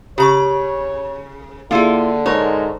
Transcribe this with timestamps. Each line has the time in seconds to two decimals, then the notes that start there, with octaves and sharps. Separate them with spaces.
0.18 C#3 G4 C#5 A#5 C#6
1.71 D3 A#3 E4 F4 G#4
2.26 G#2 D4 A#4 C#5